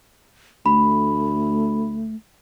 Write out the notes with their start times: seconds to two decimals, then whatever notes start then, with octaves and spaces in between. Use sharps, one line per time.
0.66 D2 A3 B5